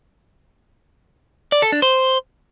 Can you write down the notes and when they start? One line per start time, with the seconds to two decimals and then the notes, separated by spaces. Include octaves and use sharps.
1.52 D5
1.62 A4
1.72 D4
1.82 C5